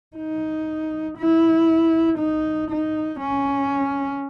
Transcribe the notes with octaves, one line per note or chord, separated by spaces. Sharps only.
D#4
E4
D#4
D#4
C#4